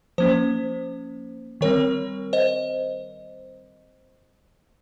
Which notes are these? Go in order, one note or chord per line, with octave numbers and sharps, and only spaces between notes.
F3 A#3 C#4 C5
D#3 G3 C4 A#4 C#5
C5 D#5